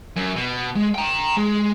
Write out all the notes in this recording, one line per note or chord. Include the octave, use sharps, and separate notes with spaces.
F#2
B2
G#3
G5 A#5
G#3